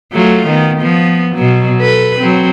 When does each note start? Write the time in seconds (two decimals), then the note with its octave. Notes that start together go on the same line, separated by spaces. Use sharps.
0.12 F#3 A3 F4
0.47 D#3 B3
0.80 F3 B3
1.34 B2 F#3
1.80 A4 B4
2.19 F#3 C4